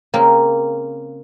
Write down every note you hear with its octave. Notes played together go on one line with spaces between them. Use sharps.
C#3 A#3 C4